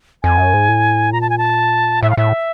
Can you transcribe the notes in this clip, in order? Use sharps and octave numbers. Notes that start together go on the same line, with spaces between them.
F2 G#5
F#2
G#2
A2
A#2 A#5
A5
G#5
A5
A2 E5
F5
A2 E5